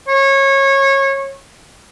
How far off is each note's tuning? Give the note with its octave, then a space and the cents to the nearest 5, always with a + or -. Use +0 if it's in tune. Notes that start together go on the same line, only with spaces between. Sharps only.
C#5 -25